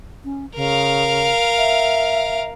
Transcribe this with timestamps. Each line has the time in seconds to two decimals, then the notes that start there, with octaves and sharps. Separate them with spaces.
0.24 C#4
0.55 C#3 A#4 F5
1.58 E5